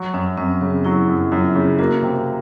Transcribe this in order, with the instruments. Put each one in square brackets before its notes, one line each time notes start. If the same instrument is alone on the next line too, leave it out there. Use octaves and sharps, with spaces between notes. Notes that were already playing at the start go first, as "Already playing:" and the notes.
Already playing: [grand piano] F#3
[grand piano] F#2 [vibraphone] C#4
[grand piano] F#2 [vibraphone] C4
[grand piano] C#3 [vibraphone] B3
[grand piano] F#3 [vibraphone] E4
[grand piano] F#2
[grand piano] F#2 [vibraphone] F4
[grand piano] C#3
[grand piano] A#3 [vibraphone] F#4
[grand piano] C3